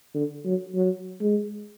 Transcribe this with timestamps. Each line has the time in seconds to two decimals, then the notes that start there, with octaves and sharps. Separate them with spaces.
0.14 D3
0.45 F#3
0.75 F#3
1.21 G#3